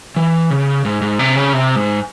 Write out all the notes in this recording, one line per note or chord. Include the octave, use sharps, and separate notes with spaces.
E3
C#3
G#2
G#2
C3
C#3
C3
G#2